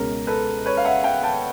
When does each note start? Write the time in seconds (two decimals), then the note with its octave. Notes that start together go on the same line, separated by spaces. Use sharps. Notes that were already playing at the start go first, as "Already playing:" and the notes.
Already playing: C#2 B2 G#3 C#4 A#4
0.27 A4 B4
0.66 B4 C#5
0.77 F5
0.85 E5 F#5
1.04 F5 G5
1.23 G5 A5